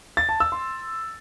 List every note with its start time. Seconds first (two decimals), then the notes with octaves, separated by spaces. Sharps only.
0.17 A6
0.29 A5
0.40 E6
0.52 C6